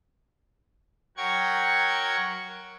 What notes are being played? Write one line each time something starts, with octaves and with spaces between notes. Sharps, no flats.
F#3 A#4 F#5 G5 C#6 G#6